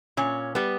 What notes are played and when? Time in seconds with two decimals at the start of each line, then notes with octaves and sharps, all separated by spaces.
0.17 A#2 C#4
0.55 G3 B3